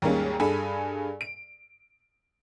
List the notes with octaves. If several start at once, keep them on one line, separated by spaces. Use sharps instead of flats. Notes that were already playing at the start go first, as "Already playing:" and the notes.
D#2 G#2 G3 G#3 A#3 C#4
G2 G#4 A4 G#5 B5
D7